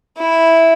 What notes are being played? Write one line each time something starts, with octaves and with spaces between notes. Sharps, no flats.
E4